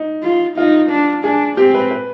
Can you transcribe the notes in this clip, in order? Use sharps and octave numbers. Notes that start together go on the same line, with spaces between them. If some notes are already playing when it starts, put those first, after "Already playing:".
Already playing: D#4
F4
D#4 F4
D4
D4 G#4
C4 G4
B4
B4